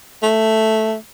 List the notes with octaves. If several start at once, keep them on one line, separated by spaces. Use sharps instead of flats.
A3